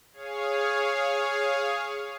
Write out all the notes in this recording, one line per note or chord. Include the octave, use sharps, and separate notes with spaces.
G#4 C#5 F5